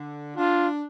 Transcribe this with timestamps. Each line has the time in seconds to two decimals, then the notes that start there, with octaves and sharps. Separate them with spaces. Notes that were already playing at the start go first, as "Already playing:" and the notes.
Already playing: D3
0.36 D4 F4